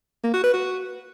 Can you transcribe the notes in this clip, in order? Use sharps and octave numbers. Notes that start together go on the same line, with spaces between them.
A#3
F#4
B4
F#4